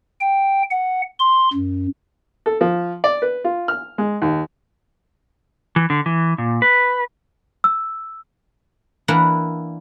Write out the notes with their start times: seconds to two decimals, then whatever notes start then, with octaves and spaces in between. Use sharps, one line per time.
0.21 G5
0.70 F#5
1.20 C6
1.53 F#2
2.46 A4
2.61 F3
3.04 D5
3.22 B4
3.44 F4
3.68 F6
3.98 G#3
4.22 D#2
5.76 E3
5.90 D3
6.06 E3
6.38 A#2
6.62 B4
7.64 E6
9.08 E3 A#3 D4 E4 F#5 A#5